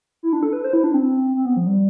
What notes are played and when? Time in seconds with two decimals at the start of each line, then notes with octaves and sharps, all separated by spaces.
0.23 E4
0.33 D4
0.43 A4
0.53 B4
0.64 C5
0.73 E4
0.84 D4
0.94 C4
1.36 C4
1.45 B3
1.57 F3
1.66 G3